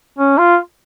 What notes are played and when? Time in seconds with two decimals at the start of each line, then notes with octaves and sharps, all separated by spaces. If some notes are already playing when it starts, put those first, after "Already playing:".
0.19 C#4
0.38 F4